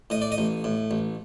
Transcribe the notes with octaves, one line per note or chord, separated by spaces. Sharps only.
A2 D#5
D5
D#5
A1
A2
A1